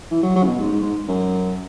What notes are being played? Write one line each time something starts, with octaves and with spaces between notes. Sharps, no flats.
E3
F#3
F#3
C#3
B2
G#2
G#2
G#2
F#2